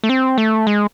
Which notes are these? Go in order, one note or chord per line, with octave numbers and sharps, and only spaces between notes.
A3
C4
A3
G#3